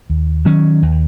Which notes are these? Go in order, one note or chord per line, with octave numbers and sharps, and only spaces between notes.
D#2
D#3 F#3 C#4
D#2